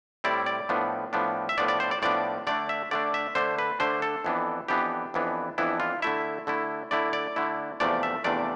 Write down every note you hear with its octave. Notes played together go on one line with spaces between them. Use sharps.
A2 G3 C4 E4 D5
D5
A2 F3 B3 D4
A2 F3 B3 D4
E5
A2 F3 B3 D4 D5
D5
C5
D5
A2 F3 B3 D4 D5
D3 A3 D4 D5
E5
D3 A3 D4 D5
E5
D3 A3 D4 C5
B4
D3 A3 D4 C5
A4
F2 E3 B3 D4
F2 E3 B3 D4 G4
F2 E3 B3 D4
F2 E3 B3 D4 E4
F4
D3 A3 E4 E5
D3 A3 E4
D3 A3 E4 D5
D5
D3 A3 E4
E2 C3 F3 A3 D4 D5
E5
E2 C3 F3 A3 D4 D5